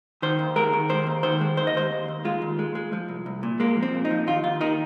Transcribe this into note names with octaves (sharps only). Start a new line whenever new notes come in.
D#3 C5
D#2
G#3 A#4
D#3
D#2 C5
D#2
D#3 C5
G#3
D#2 C5
D#5
D#2 C5
D#2
D#2
G#3 F4
D#2
G#3
G#3
F3
C2
C2
A#2
G#3 A#3
F3
C4
A#2
D#4
F3
D#2 F4
D#2 F4
D#3 D#4